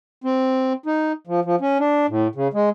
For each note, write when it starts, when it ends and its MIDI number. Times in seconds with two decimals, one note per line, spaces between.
0.24 0.73 60
0.86 1.12 63
1.27 1.40 53
1.45 1.56 53
1.61 1.78 61
1.80 2.06 62
2.09 2.28 45
2.35 2.48 49
2.54 2.69 56